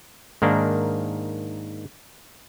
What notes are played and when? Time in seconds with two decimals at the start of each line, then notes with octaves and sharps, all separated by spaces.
0.42 G#2 D#3 A#3 D4